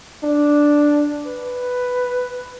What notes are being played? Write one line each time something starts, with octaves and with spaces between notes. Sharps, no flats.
D4
B4